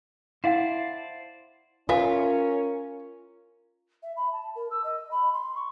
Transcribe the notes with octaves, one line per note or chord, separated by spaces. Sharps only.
E4 C5 D5 F5 F#5 A5
C#4 F4 A#4 B4 E5 G#5
E5
B5
A5
A#4
E6
D#5
B5
C6
C#6